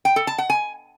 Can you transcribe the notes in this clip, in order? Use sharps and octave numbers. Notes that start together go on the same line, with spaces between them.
G5
A4
A5
F#5
G#5